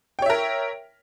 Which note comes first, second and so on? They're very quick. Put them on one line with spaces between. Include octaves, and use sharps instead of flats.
G5 C#5 E5 A#4